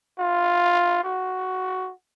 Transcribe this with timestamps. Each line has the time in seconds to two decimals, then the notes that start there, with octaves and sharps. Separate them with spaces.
0.19 F4
1.04 F#4